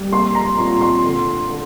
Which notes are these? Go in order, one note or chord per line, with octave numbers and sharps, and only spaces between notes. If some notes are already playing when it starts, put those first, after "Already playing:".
Already playing: G3
A#3 C6
A#5
A#2 C6
C6
D3
D3